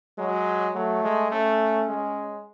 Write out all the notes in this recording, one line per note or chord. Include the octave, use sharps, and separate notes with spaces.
F#3 G#3
F#3 A3
G#3
A3 C#4
G#3